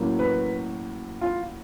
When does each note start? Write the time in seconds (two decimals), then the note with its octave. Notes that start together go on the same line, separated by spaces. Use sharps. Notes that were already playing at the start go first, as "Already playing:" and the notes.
Already playing: A2 F#3 A#3 C#4
0.19 B4
1.21 F4